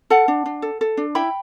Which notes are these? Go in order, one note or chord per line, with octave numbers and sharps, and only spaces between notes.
A4 F#5 A5
D4
D4
A4
A4
D4
E4 G5 B5